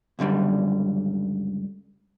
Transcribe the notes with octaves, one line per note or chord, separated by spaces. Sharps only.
C#2 F#2 D3 G3